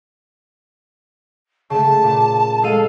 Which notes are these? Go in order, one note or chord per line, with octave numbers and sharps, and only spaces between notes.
C#3 A3 A5
A#2
G#3 A4 F5 D#7